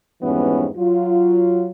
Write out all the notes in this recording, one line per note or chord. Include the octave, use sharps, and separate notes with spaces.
F2 G#2 E3 G3 B3 C#4
F#3 F4